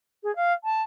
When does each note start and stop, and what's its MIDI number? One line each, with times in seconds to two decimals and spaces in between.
0.23 0.34 68
0.35 0.52 77
0.64 0.82 81